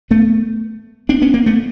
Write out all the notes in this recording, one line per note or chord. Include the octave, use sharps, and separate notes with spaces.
A3 B3
C4 D4
B3 C#4
A#3 C4
A3 B3